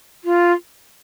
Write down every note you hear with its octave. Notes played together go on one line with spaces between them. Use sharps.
F4